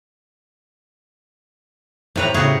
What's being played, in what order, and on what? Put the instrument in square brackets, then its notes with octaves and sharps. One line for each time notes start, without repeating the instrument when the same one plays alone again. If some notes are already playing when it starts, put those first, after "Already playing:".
[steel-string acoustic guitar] A2 C#5 [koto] C3 B4 A#5
[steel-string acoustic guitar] A2 C#3 [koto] F#4 G#4